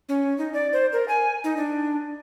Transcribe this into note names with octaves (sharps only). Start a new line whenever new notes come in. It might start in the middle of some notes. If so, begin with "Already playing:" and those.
C#4
D#4
D5
C5
A#4
G#5
D#4
D4